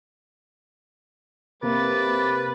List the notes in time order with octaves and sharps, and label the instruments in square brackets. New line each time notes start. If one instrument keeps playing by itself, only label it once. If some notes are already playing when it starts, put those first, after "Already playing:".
[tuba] C3 [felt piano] A#3 [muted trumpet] B4 [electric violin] D6 A6